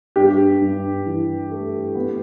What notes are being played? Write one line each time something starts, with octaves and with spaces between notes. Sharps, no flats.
G2 G4
G2
E3
A3
B3